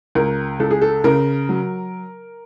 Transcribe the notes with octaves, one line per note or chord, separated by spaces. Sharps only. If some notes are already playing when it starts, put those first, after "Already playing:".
C#2 A#4
C#2 A4
G#4
A4
C#3 A#4
F#3